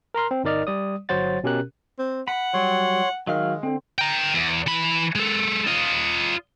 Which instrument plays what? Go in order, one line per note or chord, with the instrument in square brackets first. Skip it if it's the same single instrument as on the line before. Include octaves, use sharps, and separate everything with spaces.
[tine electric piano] A#4 A#5 C6 F6
C4
G1 D#4 A#4 D5 D#5 F6
G3 D5 D#6
G1 F#3 C5 C#5 F#5 A6
B2 C#4 G4 A#4 F#6
[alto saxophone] C4
[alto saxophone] F#5 [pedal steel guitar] B5
[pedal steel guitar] F#3 G3 [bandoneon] C#5 C6
[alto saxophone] D#3 [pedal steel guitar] F#3 F5 F6 [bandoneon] G#3
[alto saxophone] D3 [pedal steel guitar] C4
[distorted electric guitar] G5 A#5
E2
E3 B5
G#3 A4
F4 D#5